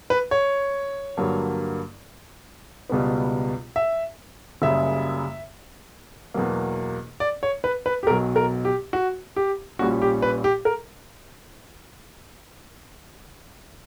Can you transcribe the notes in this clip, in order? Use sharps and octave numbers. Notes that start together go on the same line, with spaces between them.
B4
C#5
G2 D3 F#3 A#3
C#2 B2 G3 B3
E5
F#1 F#2 C#3 G3 E5
E2 B2 F#3 A#3
D5
C#5
B4
B4
G4
B1 B2 F#3 A#4
A#4
G4
F#4
G4
A#1 A#2 G3 C#4 F#4
G4
B4
G4
A#4